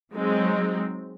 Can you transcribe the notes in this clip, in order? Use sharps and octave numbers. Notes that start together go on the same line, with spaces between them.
F#3 G#3 C4 D#4